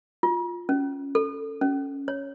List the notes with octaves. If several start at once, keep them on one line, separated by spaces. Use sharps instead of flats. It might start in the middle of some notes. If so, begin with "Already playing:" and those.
F4
C#4
A4
C#4
C#5